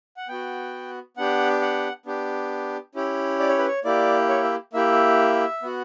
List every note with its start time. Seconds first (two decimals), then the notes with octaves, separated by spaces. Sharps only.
0.17 F#5
0.28 B3 F#4 G5
1.17 B3 D4 G4 F#5
1.62 F#5
2.06 B3 D4 G4
2.95 C#4 E4 G4
3.40 D5
3.49 C#5
3.58 B4
3.67 C#5
3.84 A#3 E4 G4 D5
4.29 C#5
4.44 E5
4.73 A#3 E4 G4 E5
5.62 B3 F#4